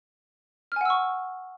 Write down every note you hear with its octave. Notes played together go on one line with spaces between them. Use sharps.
F#5 G#5 C#6 E6 F6